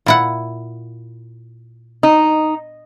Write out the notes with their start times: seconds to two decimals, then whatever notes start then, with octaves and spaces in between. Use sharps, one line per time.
0.06 A#2 E4 F#5
2.03 D#4